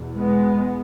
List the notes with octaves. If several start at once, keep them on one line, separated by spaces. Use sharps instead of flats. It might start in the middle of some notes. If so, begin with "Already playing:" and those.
Already playing: E2 B2
G#3 B3